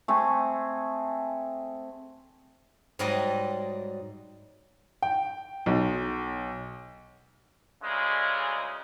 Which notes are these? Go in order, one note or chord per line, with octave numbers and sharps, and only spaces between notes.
A3 C4 G#4
G#2 F#3 G3 D5 D#5
G5
B1
D2 C#3 G#3